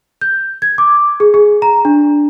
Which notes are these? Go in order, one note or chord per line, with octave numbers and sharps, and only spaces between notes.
G6
G#6
D6
G#4
G#4
A#5
D4